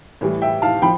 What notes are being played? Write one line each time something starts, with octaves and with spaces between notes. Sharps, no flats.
A2 E3 G3
E5 G5
F5 A5
F3 G5 B5